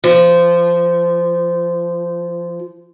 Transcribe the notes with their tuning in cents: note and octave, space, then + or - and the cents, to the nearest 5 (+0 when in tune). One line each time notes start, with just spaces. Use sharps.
F3 -20